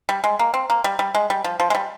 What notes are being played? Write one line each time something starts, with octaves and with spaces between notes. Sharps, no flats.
G3
G#3
A#3
C4
A#3
G3
G3
G#3
G3
F3
F3
G#3
G3